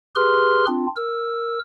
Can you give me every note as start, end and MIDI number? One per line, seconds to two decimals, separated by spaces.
0.16 0.65 67
0.16 0.65 68
0.16 0.65 71
0.16 0.65 84
0.16 0.65 89
0.67 0.87 60
0.67 0.87 62
0.67 0.87 65
0.96 1.59 70
0.96 1.59 88